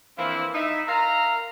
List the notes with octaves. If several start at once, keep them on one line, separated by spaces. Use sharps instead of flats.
E3 F3 A#3 C4 D4 E4
D#4 E5
A#4 E5 F5 A#5